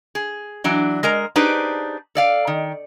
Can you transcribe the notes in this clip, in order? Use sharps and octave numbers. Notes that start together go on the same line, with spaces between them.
G#4
E3 F#3 D4
G#3 A#4 A#5
D4 D#4 G4 G#4 B4 C5
A4 D5 F5
D#3